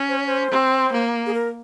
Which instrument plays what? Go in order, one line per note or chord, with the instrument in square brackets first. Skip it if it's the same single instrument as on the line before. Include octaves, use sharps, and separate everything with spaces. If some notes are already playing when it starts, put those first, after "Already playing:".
Already playing: [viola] C#4
[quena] C5
C#5
C5
[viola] C4
A#3
[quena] G#4
A#4